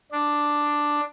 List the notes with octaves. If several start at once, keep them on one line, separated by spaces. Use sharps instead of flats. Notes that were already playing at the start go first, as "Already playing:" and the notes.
D4